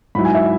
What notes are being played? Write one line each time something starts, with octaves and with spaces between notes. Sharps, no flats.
G#2 F#3 E4 B5
G#5
E5